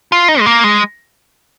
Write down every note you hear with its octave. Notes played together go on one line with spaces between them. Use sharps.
F4
D#4
G#3
A#3
G#3